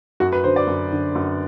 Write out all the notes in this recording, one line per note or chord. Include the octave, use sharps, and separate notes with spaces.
F#2 F#4
B4
D3 C5
D5
F#2
D3
F#2